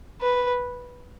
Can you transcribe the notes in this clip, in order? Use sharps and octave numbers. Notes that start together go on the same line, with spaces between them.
B4